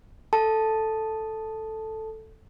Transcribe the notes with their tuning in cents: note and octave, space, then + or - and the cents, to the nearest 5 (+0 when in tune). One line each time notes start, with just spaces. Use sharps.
A4 +0 A5 -5